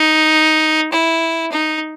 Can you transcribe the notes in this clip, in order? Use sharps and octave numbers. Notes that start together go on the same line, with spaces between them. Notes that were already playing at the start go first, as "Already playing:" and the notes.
Already playing: D#4
E4
D#4